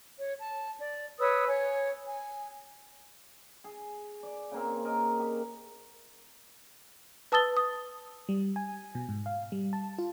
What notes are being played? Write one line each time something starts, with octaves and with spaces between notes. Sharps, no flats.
C#5
A5
D5
B4 C#5 D#6 E6
C#5 G#5
G#5
G#4
D5
C#3 A#3 C4
A#4 D#5
G4
B4 A5 D#6 E6 A6 G7
D#6
G3
G#5
B2
G#2
F5
G3
A5
F4